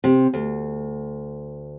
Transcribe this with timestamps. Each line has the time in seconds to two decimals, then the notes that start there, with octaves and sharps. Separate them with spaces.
0.04 C3
0.34 D2